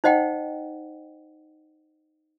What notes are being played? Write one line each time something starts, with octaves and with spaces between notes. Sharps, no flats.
D#4 C5 D#5 F#5 G5